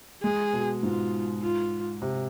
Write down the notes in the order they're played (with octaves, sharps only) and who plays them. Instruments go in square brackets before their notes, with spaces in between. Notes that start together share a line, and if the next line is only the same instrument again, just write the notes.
[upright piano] G#3 [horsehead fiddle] G#4
[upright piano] B2
[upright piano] G#2 [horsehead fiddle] F4
[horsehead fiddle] F4
[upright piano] C3